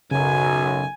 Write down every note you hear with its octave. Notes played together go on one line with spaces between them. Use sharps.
B1 F#2 C#3 C#4 G#5